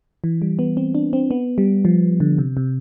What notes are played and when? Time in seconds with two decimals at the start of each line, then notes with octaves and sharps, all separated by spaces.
0.24 E3
0.42 G3
0.59 B3
0.77 C4
0.95 D4
1.13 C4
1.31 B3
1.58 G3
1.85 F3
2.20 D3
2.38 C3
2.57 C3